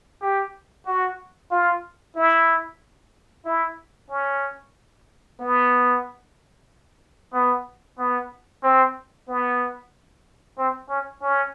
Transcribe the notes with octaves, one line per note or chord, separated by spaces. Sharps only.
G4
F#4
F4
E4
E4
C#4
B3
B3
B3
C4
B3
C4
C#4
C#4